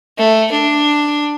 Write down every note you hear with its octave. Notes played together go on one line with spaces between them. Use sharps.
A3
D4